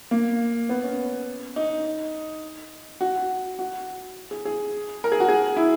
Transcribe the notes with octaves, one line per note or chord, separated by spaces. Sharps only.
A#3
B3
C#4
D#4
F#4
F#4
G#4
G#4
A#4
G#4
F#4
G#4
E4